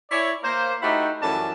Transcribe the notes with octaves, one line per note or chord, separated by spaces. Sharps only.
E4 C#5 D5
A#3 C5
A3 D#4 E4 F#4 G4
F#2 E3 G3 A3 C#4 A5